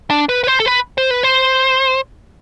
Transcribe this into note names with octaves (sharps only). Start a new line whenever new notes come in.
D4
B4
B4
C5
A4
B4
C5
B4
C5